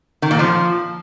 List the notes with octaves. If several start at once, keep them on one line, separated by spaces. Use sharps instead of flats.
D#3
A#2
F3